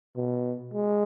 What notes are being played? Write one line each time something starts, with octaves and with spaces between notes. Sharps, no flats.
B2
G#3